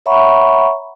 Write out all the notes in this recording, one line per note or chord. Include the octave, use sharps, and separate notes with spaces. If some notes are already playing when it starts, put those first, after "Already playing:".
C#5 E5 F#5 A#5 B5 C#6